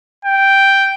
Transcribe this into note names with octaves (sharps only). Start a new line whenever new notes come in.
G5